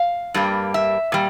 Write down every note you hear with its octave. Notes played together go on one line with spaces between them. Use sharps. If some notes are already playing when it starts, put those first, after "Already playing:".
Already playing: F5
G2 G3 A#3
E5
A#2 G3